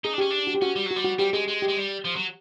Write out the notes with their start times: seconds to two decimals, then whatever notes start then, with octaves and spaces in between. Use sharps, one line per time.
0.04 D#4 G#4
0.13 D4
0.18 C#4 G4
0.31 D4
0.47 F#4
0.55 G4
0.61 C#4 F#4
0.76 G3
0.86 F#3 F#4
0.96 G3
1.05 F#4
1.19 G3 G4
1.33 G#3 G#4
1.48 G#3
1.62 G4
1.68 G#3
1.76 G3
2.05 F3
2.16 F#3